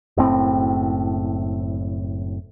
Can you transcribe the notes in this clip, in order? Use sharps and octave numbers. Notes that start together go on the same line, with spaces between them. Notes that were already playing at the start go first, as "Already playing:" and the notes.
F#1 A2 C4